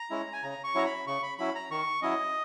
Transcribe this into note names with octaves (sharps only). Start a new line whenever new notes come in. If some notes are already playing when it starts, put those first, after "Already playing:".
Already playing: A#5
G#3 C#4 E4
G#5
C#3 A#5
C#6
F#3 C#4 E4 A#5
B5
C#3 C#6
B5
F#3 C#4 E4 B5
A#5
D#3 C#6
F#3 C#4 E4 D#5